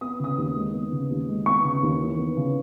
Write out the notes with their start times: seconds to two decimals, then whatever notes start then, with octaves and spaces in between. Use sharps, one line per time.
0.01 B3 D#6
0.20 C#3 D#6
0.38 D#2
0.56 G#3
0.74 B3
0.92 C#3
1.10 D#2
1.28 G#3
1.46 B3 C#6
1.64 C#3
1.83 D#2
2.01 E3
2.19 B3
2.37 C#3